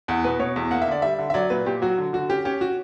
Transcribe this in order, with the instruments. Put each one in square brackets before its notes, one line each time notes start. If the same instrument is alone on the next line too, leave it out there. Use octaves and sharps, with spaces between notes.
[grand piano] E2 [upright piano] F#5
[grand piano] B2 [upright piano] B4
[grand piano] B2 [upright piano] C#5
[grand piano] E2
[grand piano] A#3 [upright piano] F#5
[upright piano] E5
[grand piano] D3 [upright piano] D5
[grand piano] G3 [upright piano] E5
[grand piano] D3
[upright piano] E5
[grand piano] F#3 [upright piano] D5
[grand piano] A#2 [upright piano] B4
[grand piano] A#2 [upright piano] G4
[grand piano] F#3 [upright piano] F#4
[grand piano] D3
[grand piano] D3 [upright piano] F#4
[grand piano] C#4 [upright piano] G4
[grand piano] C#4 [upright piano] G4
[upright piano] F#4